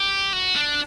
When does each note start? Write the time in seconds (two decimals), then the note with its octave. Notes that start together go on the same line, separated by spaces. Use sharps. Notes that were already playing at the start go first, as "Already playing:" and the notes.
Already playing: G4
0.33 F#4
0.56 D4